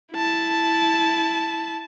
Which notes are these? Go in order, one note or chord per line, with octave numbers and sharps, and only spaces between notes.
E4 A5